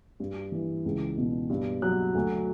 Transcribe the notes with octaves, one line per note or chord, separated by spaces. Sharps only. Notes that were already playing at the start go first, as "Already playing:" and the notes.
G2
E3
C#2
B2
G2
F#3 F#6
D2